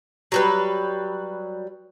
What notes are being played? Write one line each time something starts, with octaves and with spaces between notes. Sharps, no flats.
F#3 G3 B4